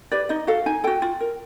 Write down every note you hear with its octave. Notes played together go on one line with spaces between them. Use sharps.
G4 B4 D5
D#4 D#5
F#4 A4 F5
D#4 G#5
F#4 A4 G5
F4
A#4